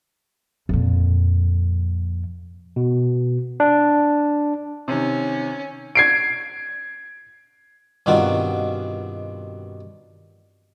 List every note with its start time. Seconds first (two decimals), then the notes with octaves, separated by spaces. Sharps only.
0.69 F2 A#2
2.76 B2
3.60 D4
4.88 C3 D#3 C#4
5.95 G#6 C7 D7
8.06 G2 B2 D#3 C4 F4 F#4